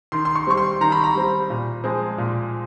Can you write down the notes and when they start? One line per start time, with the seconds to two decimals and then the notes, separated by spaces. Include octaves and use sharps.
0.12 D#3 C6
0.25 C6
0.36 C#6
0.47 G3 C4 C#6
0.57 C6
0.81 D#3 A#5
0.92 B5
1.04 A#5
1.15 G3 C4
1.50 A#2
1.84 F3 G#3 C4
2.18 A#2